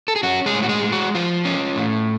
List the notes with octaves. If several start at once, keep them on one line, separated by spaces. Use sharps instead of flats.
A4
G#4
C#4 F#4
G#3 G#4
A2
F#4
G#3 G#4
G#3
F#4
F3 F4
C#4
A2